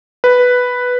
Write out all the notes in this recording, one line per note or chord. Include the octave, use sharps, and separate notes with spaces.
B4